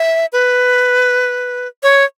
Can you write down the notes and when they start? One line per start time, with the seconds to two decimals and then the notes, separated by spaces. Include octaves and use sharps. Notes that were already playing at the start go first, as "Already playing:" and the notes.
Already playing: E5
0.33 B4
1.83 C#5